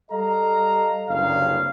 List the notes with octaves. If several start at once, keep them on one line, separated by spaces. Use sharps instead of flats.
G3 A4 D#5 F5 A#5
F#1 C2 G2 C#3 F5